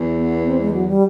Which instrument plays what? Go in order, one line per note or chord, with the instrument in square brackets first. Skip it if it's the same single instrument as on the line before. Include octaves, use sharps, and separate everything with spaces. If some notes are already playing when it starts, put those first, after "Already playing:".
Already playing: [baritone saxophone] E2
[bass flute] B3
C4
G#3
F#3
G3